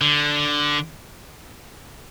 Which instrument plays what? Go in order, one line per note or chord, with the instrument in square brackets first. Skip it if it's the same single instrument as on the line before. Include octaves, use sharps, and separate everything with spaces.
[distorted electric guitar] D3